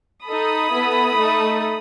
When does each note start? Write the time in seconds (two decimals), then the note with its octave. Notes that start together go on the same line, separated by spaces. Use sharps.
0.25 D#4 A4 B5 D#6
0.71 B3 E4 A4
1.17 A3 D#4 A4